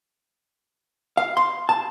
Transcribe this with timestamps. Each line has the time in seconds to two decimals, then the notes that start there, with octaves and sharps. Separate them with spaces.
1.17 F5
1.37 C6
1.69 A5